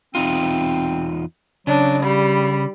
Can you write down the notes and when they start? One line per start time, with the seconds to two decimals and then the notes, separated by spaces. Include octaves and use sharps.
0.15 E2 C4 D#4 F4
1.67 C#3 F#3 D4
2.03 G3 B5